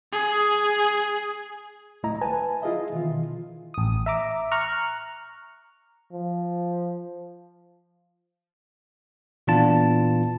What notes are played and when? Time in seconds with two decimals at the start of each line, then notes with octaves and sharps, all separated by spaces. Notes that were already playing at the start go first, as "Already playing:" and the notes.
0.13 G#4
2.03 C#2 A2 A3 E4 D#5 A#5
2.21 B4 G#5 A5
2.62 E4 F4 G#4 D#5 E5
2.92 B2 D#3 E3 F4
3.74 A1 D#6
4.06 E5 A#5 D6
4.52 A#5 C#6 F6 F#6
6.13 F3
9.47 A#2 E3 B3 D4 F4 A5